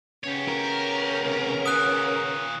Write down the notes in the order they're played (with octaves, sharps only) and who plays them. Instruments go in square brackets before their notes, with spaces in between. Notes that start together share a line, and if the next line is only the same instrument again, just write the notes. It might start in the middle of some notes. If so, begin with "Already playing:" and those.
[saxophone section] C#3 B3 C#4 [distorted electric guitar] G4 C#5
[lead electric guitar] A#4
[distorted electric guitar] D#2 C3
[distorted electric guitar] A#2 D#3 [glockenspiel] D#6 F#6